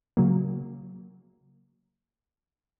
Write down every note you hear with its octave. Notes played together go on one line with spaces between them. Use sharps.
C#3 F#3 A#3